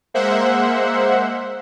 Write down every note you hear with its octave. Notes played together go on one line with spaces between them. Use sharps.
G#3 A#3 C5 E5 F#5